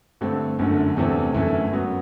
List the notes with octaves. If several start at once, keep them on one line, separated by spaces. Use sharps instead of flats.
G2 D3 A3 C4
G1 F#2 D3 A3
E2 C3 E3 A3 C4
G1 F#2 E3 A3 E4
F#2 F#3 B3